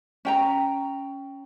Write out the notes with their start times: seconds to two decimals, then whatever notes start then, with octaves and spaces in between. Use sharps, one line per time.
0.25 C#4 G5 A#5